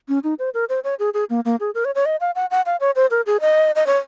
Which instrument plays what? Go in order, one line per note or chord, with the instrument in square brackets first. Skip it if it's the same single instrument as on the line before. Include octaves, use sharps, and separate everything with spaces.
[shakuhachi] C#4
D#4
C5
A#4
C5
C#5
G#4
G#4
A#3
A#3
G#4
A#4
C#5
C#5
D#5
F5
F#5
F#5
F5
C#5
C5
A#4
G#4
D#5
D#5
C#5